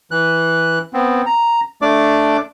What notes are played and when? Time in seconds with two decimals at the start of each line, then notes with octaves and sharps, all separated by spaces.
0.11 E3 F#6
0.94 B3 C4
1.26 A#5
1.82 A3 D4 D5 D6